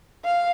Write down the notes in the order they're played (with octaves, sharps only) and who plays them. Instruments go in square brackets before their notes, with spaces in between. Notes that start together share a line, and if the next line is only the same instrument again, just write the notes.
[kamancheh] F5